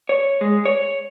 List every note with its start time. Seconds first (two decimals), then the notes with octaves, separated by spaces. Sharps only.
0.09 C#5
0.41 G#3
0.65 C#5